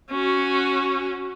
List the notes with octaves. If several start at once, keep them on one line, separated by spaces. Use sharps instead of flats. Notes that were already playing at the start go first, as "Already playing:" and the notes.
C#4 F#4